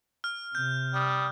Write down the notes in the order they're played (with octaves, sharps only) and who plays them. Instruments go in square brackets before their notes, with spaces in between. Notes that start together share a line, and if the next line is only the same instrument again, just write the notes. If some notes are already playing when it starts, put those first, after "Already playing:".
[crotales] F6
[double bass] C3 [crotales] G6
[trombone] G3 [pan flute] D#6